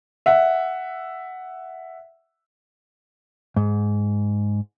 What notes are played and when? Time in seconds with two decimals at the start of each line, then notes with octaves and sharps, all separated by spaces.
0.26 E5 F#5
3.57 G#2